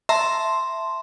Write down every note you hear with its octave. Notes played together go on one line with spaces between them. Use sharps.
E5 A5 A#5 C6